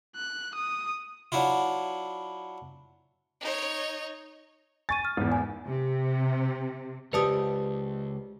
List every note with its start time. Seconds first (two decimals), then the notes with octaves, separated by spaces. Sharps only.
0.16 F#6
0.55 D#6
1.32 F#3 D4 E4 F4
3.41 D#4 C#5
4.89 G#5 C#6 A6 D#7
5.05 F6
5.17 G#1 E2
5.32 G#5
5.67 C3
7.13 C#2 G4 B4 C5 D5 A5 D#6